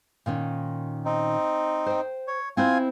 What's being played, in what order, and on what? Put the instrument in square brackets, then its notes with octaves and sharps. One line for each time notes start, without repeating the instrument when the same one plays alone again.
[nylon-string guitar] A#2 D#3 C#4
[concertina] C4 D#4
[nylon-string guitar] C5 G5
[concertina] C#5
[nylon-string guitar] C4 E4 C5 [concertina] F4 G#5